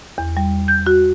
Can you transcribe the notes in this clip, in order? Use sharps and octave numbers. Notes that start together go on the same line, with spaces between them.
E2
G3
G6
F#4